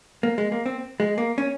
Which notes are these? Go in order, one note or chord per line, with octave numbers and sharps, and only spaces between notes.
A#3
G#3
A#3
C4
G#3
A#3
C#4